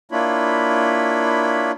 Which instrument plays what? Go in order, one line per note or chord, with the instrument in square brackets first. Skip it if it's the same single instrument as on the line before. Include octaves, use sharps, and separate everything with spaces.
[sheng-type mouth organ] A#3 D4 E4 F4 C#5 B5